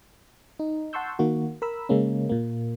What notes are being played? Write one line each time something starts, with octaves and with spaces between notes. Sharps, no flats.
D#4
F#5 A5 C6 C#6 E6 G6
D#3 A#3 F#4
A#4 B5 E6
C#3 G#3 A#3 C#4
A#2 A#3